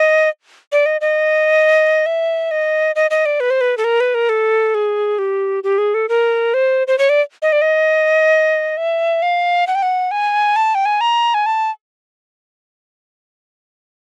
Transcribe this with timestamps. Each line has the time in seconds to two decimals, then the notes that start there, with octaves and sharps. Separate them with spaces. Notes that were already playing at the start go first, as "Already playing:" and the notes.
Already playing: D#5
0.72 D5
0.86 D#5
1.01 D#5
2.06 E5
2.51 D#5
2.96 D#5
3.11 D#5
3.26 D5
3.40 B4
3.50 C5
3.61 B4
3.78 A4
3.84 A#4
4.00 B4
4.15 A#4
4.29 A4
4.75 G#4
5.19 G4
5.64 G4
5.78 G#4
5.94 A4
6.09 A#4
6.54 C5
6.87 C5
6.98 C#5
7.09 D5
7.42 D#5
7.52 D5
7.62 D#5
8.77 E5
9.22 F5
9.67 F#5
9.75 G5
9.82 F#5
10.11 G#5
10.56 A5
10.75 G5
10.86 G#5
11.01 A#5
11.34 G#5
11.46 A5